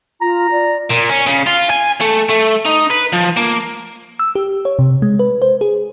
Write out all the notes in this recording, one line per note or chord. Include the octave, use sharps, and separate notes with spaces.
F4 A#5
D5
A#2
C#4
C#3
F4
G#5
A3
A3
D#4
B4
F3
A#3
E6
G4
C#5
C3
G#3
B4
C5
G#4